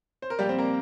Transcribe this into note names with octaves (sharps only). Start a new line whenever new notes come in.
C5
A#4
A#2 F3 G3 A#3 G4
C4 C5
A#3 A#4